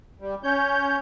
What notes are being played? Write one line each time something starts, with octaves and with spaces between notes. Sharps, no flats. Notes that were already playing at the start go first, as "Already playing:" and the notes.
G3
C#4 C#5 G6